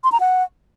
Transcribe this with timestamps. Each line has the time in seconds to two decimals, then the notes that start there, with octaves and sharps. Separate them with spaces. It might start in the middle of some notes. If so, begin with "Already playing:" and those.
0.04 C6
0.12 A#5
0.20 F#5